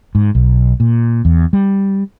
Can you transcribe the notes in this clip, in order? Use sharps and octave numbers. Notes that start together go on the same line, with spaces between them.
G#2
B1
A#2
E2
G3